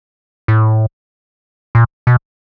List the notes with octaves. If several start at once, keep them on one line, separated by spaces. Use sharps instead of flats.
A2
A#2
B2